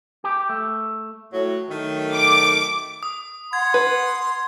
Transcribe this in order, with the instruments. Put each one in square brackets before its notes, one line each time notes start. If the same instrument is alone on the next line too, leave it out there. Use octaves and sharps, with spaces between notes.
[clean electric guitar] G4
A3
[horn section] A2 F#3
D#3 F#3 A3
[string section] D6
[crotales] D#6
[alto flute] F#5 [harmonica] C6 [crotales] G#6
[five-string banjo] B4